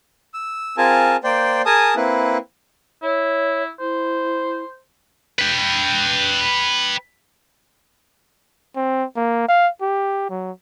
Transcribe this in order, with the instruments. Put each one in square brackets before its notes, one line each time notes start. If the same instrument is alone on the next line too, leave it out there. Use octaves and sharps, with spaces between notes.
[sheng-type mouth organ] E6
C4 F4 G#4 A#4 G#5 A5
A#3 C5 D5 G5
G#4 A#4 G#5 A5 D#6
A#3 C4 E4 B4
[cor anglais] E4 [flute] C#5
[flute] E4 [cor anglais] C5
[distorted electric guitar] B4 G5
[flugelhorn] C4
A#3
F5
G4
F#3